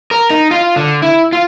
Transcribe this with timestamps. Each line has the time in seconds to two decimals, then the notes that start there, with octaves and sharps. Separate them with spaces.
0.11 A#4
0.30 D#4
0.51 F4
0.76 D3
1.02 E4
1.33 F4